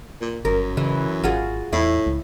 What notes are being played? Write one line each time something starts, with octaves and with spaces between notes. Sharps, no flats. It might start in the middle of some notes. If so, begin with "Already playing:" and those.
A#2
G1 F#2 A#4
C#3 E3
G#1 F4 F#4 G#4
E2 A2 E4
C#2